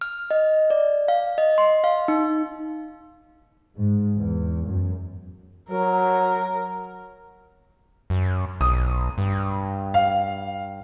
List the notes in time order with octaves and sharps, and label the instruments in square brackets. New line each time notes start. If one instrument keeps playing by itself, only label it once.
[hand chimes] F6
D#5
D5
F5
D#5
C6
F5
D#4
[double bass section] G#2
E2
F#2
[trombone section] F#3 [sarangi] A#4
[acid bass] F#2
[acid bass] B1 [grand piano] D#6
[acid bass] G2
[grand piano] F5